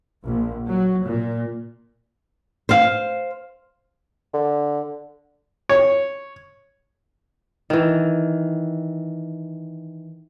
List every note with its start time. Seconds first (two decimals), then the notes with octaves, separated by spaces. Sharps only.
0.24 A#1
0.67 F#3
1.06 A#2
2.69 C5 F5
4.34 D3
5.69 C#5
7.70 D#3 E3